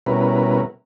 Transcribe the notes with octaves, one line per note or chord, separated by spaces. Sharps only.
B2 G3 C#4 E4 A#4 B4